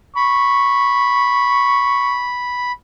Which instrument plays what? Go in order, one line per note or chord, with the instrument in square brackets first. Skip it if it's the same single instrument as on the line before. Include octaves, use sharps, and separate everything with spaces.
[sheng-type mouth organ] B5 [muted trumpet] C#6